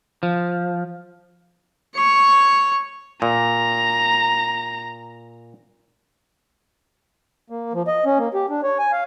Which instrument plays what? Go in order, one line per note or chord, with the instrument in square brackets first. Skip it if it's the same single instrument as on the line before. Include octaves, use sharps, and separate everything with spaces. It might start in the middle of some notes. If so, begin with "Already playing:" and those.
[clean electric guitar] F3
[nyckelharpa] C#5 C#6
[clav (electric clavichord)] A#2 [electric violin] A#5
[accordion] A#3
F3
D#5
C#4
A#3
G4
D4
C#5
G#5
F5